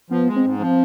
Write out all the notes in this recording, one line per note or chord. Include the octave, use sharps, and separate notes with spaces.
F3 B3
G#3
C4
G#2
F3